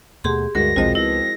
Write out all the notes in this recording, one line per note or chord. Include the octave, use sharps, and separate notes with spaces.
D#2 B2 A3 G4 G#4 C6
D2 G2 G#3 F#4 A#4 A#6
A#1 D#2 B2 F3 G#3 C4 F#4 D#5
C#2 G3 B3 E4 A#6